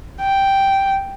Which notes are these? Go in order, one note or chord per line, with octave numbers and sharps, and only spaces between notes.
G5